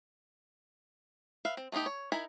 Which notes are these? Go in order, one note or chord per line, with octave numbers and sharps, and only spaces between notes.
B4 E5 F5
C4
A3 B3 C#4 D#4 G4
C#5
D#4 E4 A#4 G#5 B5